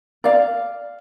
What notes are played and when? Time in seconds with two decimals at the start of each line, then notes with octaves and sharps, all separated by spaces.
0.24 D5 F5